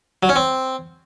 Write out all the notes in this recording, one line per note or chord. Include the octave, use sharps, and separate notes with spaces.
F#3
C#4
C4